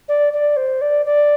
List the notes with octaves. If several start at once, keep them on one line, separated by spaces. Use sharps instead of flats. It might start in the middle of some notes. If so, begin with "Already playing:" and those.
D5
D5
C5
D5
D5